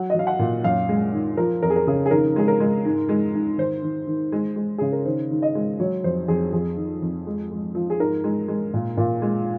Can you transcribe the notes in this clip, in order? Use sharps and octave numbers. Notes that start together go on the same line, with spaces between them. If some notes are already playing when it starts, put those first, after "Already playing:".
Already playing: F#3 F#5
D#5
F#3 F5
F#5
A#2
F#2 F5
G#3
D#3
F3 A#4
F2 A#4
G#4
A#4
C#3 G#4
G#4
D#3 A#4
G#3 G#4
A#4
G#3
G#2
G#3
G#2
D#3 C5
D#3
D#3
G#3
G#3
C#3 G#4
A#4
D#3 C5
D#3
D#5
G#3
F#3 C#5
F2 C5
F2 G#4
F2 G#4
D#3
F2
G#3
G#3
F3
G#4
G#2 A#4
G#3
G#3
A#2
A#2
G#3